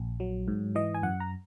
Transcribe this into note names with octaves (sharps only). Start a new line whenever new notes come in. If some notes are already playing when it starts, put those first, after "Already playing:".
Already playing: A#1
F#3
G#2
E3 D#5
G#5
F#2 F#5
A#5